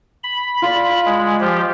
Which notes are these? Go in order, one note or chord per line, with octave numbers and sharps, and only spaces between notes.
B5
F4 D5
G#3
F3 G4